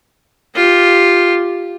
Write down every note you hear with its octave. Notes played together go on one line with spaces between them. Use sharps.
F4 G4